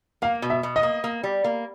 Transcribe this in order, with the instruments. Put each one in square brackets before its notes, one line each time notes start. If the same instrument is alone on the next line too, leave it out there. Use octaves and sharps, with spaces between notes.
[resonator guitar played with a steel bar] A#3 [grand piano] F5
[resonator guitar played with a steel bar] B2
[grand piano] E5
[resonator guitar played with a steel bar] B2
[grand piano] D#5
[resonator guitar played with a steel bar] A#3
A#3
G3
A#3